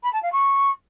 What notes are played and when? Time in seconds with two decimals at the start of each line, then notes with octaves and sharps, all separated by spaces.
0.03 B5
0.13 A5
0.22 F5
0.32 C#6